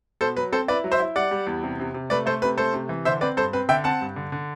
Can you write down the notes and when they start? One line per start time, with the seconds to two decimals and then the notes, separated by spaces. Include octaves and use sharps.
0.21 B2 A4 C5
0.36 F#3 B4
0.52 C4 A4 C5
0.68 E4 B4 D5
0.84 F#3
0.92 C5 E5
1.00 E4
1.16 G3 D5 F#5
1.31 G3
1.47 E2
1.63 C3
1.80 C3
1.94 C3
2.10 A3 B4 D5
2.26 A3 A4 C5
2.42 C3 B4
2.58 A3 A4 C5
2.74 C3
2.89 E3
3.05 D3 C5 E5
3.21 C4 B4 D5
3.37 G2 A4 C5
3.53 C4 B4
3.69 D3 E5 G5
3.84 C4 F#5 A5
4.01 G2
4.16 D3
4.32 D3